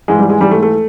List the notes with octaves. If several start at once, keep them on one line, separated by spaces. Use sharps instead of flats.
G#2 E3 G#3
G3
G#3
G#2 E3 G3
A3
A3